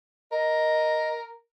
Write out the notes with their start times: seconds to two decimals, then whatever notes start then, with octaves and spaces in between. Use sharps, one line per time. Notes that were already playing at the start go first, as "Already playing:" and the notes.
0.32 A#4 D#5